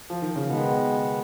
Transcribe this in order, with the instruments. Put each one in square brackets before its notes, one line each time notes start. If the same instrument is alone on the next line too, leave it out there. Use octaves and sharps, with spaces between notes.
[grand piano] F3
D#3
C#3
[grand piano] B2 [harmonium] D#3 G#3 B3